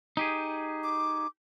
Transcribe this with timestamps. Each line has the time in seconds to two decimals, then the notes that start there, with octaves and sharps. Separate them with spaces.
0.17 D#4 G4 G#4
0.83 D6